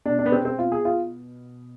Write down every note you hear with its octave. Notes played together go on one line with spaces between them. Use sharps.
B2 D4
D4
B3
C4
C4
F4
G#4
F4